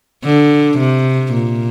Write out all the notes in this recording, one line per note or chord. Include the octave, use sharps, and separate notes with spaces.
D3
C3
A#2